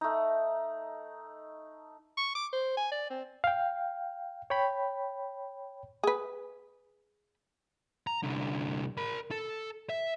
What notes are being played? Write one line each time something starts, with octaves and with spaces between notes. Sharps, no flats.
A3 D#4
C#6
D6
C5
G#5
D5
C4
F5 G5
C#5 G5 B5
G#4 B4
A#5
C2 D3
A#4 B5
A4
E5